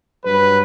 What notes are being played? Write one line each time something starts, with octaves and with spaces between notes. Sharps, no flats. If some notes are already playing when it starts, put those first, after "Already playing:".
G2 F#3 B4